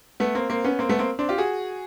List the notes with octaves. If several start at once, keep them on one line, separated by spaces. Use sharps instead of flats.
A3 B3
A#3 C4
A#3 C4
B3 C#4
A#3 C4
A3 B3
A#3 C4
C4 D4
F4 G4
F#4 G#4